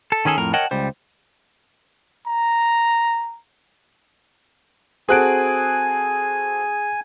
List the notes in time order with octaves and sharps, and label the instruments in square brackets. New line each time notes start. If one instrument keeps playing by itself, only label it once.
[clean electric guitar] A4
D#3 C#4 G#4 A4
F2 A2 A#4
A#4 C#5 D#5 F#5 G5 A5
C#2 G3 C5
[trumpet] A#5
[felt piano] C4 F#4 A4 [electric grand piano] G#4 F#6 D7 [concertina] G#5